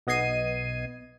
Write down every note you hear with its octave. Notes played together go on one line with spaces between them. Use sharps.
B1 B3 D#5 G#6 C7 D#7